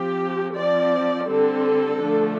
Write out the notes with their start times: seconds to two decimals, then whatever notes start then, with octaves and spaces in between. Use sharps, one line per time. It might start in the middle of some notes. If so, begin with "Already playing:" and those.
Already playing: F3 C4 G4
0.57 F3 C4 D5
1.29 D3 G3 C4 A4
2.00 D3 F3 A3 D4